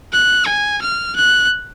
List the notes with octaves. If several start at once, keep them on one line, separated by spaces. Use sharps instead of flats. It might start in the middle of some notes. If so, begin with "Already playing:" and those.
F#6
G#5
F6
F#6